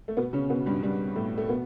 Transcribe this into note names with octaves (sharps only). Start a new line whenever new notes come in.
A3
B2 B3
C#3 C#4
B2 B3
G2 G3
G2 G3
A2 A3
A3
B2 B3